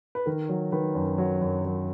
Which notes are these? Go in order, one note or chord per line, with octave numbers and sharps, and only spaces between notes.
B4
D#3 A#4
F#3
D#3 B4
F#2
F#3
F#2
F#3